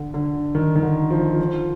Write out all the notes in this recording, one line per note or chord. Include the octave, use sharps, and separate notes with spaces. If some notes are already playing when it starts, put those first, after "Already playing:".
Already playing: D3
D3
D#3
D#3
D3
F3
F3